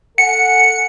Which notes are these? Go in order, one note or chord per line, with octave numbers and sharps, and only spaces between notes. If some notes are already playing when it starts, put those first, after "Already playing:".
A4 F#5 G#5 C#7